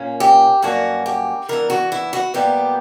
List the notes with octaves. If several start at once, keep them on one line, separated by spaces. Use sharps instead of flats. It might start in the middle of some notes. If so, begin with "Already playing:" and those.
Already playing: A#2 A#3 C#4
G4
G2 F#3 A#3 C#4 F#4
G4
G2 E3 B3 A#4
F#4
E4
F#4
A#2 G3 B3 G4